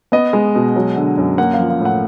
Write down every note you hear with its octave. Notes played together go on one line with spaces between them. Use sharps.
B3 D#5
G#3
B2
F#3
D3
F#2
A#3 F#5
F5
F3
F5
A2
F#5